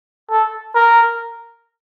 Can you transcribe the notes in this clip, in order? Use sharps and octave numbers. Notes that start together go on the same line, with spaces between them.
A4
A#4